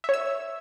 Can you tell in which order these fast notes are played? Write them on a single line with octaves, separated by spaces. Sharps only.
E5 C#5 E6